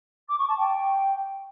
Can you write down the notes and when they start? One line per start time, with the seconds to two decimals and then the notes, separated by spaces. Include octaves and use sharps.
0.28 D6
0.38 C#6
0.48 A5
0.58 G5